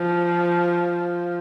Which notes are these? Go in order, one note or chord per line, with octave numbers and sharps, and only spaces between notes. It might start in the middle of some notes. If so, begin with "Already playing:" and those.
Already playing: F3